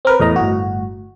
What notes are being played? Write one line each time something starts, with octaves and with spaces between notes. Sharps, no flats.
C4 A#4 B4
E2 A2 D#5 A#5
G1 A2 F#4